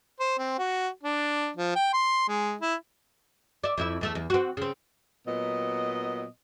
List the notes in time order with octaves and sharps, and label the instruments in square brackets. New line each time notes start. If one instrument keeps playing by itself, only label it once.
[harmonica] C5
C4
F#4
D4
F3
G5
C6
G#3
E4
[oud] D5 E5
F2 E4 E5
E2 A3 E5
E2
C4 F#4
C#3 C4
[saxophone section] A#2 F#3 B3 D#5